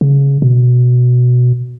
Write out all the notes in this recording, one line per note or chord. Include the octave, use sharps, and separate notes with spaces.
C#3
B2